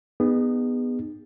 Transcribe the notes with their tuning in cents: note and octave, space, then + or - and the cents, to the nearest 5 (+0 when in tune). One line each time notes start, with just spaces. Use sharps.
B3 +0 D#4 -30 G#4 -35